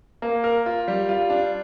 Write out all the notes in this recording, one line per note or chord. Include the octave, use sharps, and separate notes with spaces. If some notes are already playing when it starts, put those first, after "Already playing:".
A#3
A#4
F4
G3
F4
D4